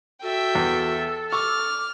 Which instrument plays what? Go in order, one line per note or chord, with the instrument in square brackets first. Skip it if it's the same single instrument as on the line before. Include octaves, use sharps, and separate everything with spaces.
[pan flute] F#4 [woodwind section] A4 [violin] E5 G5
[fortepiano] E2
[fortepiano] C#6 [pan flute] D6 [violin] F6